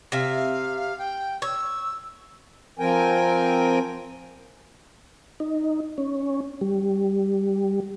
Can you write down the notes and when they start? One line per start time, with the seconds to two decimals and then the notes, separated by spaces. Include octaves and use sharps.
0.12 C3 E5 F5
0.98 G5
1.42 C#5 E6
2.79 F3 C4 A#4 G5 G#5
5.40 D#4
5.98 C#4
6.61 G3